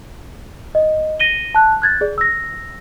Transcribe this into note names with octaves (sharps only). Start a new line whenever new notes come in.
D#5
A#6 D#7 G7
A5 F#6
F#6 G#6 A6
G#4 D5
E6 A#6